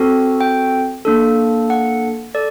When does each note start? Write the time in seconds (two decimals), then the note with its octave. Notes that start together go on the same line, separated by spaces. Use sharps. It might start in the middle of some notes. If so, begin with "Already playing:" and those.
Already playing: C4 F#4 A4
0.41 G5
1.05 A#3 D4 A4
1.70 F#5
2.35 A4 D5